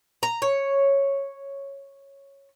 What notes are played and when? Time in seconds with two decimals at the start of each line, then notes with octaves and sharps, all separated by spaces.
0.23 A#5
0.42 C#5